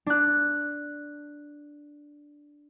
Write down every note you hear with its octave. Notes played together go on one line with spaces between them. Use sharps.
D4 F#6